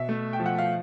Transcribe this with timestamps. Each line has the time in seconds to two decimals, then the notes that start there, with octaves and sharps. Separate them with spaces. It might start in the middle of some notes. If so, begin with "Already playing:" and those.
Already playing: B2 E5
0.09 A3
0.33 G5
0.40 F3
0.46 F#5
0.58 F5